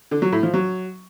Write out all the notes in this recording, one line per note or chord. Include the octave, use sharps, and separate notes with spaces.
D3
F#3
A2
F3
F#3